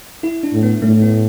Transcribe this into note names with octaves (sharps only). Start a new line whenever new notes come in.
E4
D4
A2
B3
A2 A3
B3